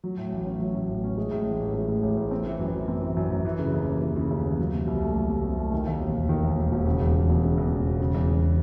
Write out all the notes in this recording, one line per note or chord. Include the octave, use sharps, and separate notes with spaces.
F#3
A2
A1
C#4
F#3
A2
A1
C#4
G#3
A2
A1
A1
G#3
A2
A1
A1
C4
E3
F#2
F#2
C4
E3
F#2
F#2
E3
C#3
D#2
D#2
E3
C#3
D#2
D#2
F#3
C3
C2
A3
F#3
C3
C2
A3
D#3
D#2
E1
E1
D#3
D#2
E1
E1
C#3
E2
E1
E1
C#3
E2
E1
E1
C#3
E2
E1